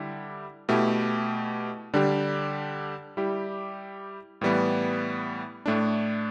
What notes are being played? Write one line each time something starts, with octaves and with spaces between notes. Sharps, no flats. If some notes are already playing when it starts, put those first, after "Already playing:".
Already playing: D3 G3 E4 G4
B2 A3 E4 G4
D3 G3 D4 G4
G3 E4 G4
A2 E3 G3 B3
A2 A3 D4